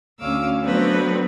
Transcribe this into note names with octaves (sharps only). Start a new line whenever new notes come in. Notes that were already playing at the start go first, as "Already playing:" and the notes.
D2 C#4 F5 D6 E6
F#3 A3 B3 C4 D4 B4